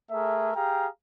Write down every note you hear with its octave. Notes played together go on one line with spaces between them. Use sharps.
A3 G#4 A#4 E5
G4 G#4 F5 G5 A#5